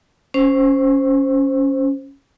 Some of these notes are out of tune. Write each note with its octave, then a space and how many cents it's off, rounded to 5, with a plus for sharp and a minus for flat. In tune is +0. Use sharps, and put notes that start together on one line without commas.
C#4 +0 C5 +0